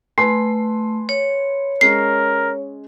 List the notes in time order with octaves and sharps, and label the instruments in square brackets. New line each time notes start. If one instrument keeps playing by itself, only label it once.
[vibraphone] A3 [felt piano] B4 G#5 C6
[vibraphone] C#5
[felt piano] G#3 C#4 G#4 [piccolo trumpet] A#4 [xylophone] C7